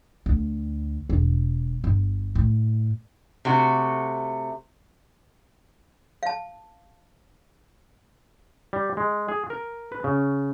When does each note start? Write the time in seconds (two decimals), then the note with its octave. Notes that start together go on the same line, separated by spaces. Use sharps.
0.26 D2
1.09 E1
1.84 G1
2.35 A2
3.45 C3 A3 F#4
6.23 F5 A5
8.73 G3
8.97 G#3
9.29 G#4
9.50 A#4
9.92 B4
10.04 C#3